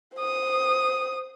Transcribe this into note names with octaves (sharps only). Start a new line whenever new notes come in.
C5 D#6